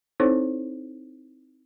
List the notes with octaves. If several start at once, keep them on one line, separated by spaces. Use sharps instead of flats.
C4 D#4 E4 A4 C5 C#5